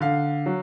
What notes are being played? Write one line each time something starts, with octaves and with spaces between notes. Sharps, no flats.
D3 F5
F#3